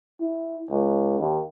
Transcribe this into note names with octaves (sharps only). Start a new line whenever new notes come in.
E4
C#2
D#2